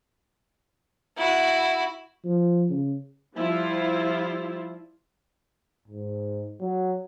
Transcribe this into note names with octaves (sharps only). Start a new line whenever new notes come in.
E4 F#4
F3
C#3
F3 G3 E4 F4
G#2
F#3